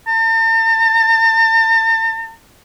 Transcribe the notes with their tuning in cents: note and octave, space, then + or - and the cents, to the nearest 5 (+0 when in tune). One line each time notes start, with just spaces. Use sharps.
A5 +45